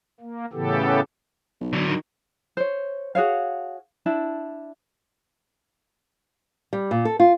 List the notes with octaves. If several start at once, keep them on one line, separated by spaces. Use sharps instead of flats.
A#3
A2 C#3 E3 B3 G4 A4
B1
D3 F#3
D#3
C5 C#5
F#4 G#4 C#5 F5
D4 E4 A5
G3
A#2
A4
F4